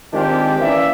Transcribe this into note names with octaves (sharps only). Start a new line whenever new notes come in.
D#3 G#3 C4 D4 F4 G4
E3 A#3 C#4 D5 E5